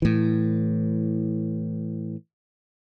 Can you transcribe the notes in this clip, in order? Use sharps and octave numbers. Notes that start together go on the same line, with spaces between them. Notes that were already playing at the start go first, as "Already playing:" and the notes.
A2 E3